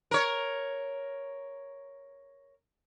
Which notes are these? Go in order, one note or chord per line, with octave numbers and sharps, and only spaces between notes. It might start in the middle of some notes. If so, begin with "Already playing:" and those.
A#4 C#5